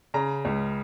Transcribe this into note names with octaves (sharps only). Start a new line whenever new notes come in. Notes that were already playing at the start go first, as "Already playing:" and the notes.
C#3 A#5
C#2